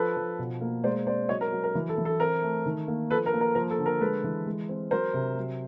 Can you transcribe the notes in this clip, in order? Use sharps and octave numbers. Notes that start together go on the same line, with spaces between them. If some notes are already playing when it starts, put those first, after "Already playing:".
Already playing: F3 A4 B4
F3
B2
A#3
G#3 C5 D5
C4 C5 D5
F#3 C#5 D#5
A#4
F#3
A#4
E3
A4
E3
A4
C4 A#4
A3
D#3
A#3
F3 A4 B4
A#4
A#3
A#4
F3 A#4
A4
D3
A#4
G#3 A4 B4
E3
G#3
C4
F#3 A#4 C5
C3
F#3